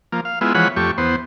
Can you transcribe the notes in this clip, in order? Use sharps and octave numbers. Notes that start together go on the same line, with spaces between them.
F3 A#3
F5
G#3 B3 E4 F4
E3 F3 G#3 C#5 F#5 B5
F2 A3 G4 C#6
E2 B3 C5